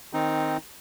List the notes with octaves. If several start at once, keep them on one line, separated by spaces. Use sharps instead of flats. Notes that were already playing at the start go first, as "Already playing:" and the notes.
D#3 C4 D#4